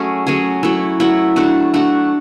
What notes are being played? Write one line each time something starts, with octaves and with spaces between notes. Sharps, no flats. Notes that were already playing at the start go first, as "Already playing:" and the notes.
Already playing: F#3 A3 C#4 G#4
F#3 A3 C#4 G#4
F#3 A3 E4
F#3 A3 E4
A3 D4 F#4
A3 D4 F#4